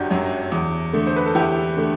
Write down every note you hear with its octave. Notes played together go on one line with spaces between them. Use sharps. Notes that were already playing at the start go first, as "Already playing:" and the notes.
Already playing: G1 F#2 D4 F#4 G4
F#2 F#3
E2
D3 A3
C5
B4
A4
E2 E4 G4
D3 A3